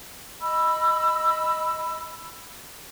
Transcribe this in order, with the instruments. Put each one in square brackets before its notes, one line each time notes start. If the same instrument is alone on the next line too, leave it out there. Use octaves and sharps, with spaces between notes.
[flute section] D#5 B5 E6